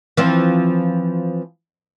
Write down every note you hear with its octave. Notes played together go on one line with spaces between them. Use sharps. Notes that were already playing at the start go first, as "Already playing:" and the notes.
E3 F3 C4